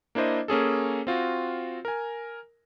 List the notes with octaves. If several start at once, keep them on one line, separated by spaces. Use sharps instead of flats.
A#3 D4 E4 C5 D#5
A#3 C#4 G#4 A4
C4 F4 F#4
A#4 G#5